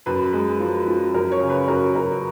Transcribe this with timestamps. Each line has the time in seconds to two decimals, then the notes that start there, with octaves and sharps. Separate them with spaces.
0.06 F#2 B4
0.33 G#3
0.60 F3
0.87 F3
1.14 F#2 A#4
1.32 C#5
1.40 C#3
1.50 B4
1.68 F#2 A#4
1.95 F#2 A#4